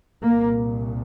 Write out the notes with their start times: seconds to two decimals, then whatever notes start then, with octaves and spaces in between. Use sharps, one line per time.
0.22 C2 A#2 A#3